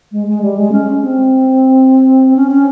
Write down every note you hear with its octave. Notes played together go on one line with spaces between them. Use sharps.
G#3
G#3
G3
G#3
C#4
C4
C#4
C#4